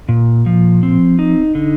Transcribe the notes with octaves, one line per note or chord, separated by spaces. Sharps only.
A#2
F3
C4
D#4
D3